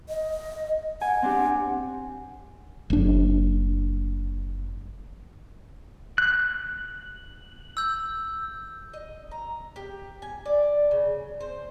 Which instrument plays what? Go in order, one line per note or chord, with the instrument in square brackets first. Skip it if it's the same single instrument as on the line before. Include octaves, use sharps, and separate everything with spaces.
[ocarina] D#5
[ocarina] F#5 [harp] G#5
[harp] C4 D4 G4
[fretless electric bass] F#1 D4
[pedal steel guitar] F#6
[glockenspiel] E6 G6
[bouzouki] D#5
A#5
G4
G#5
D5
C#3
C5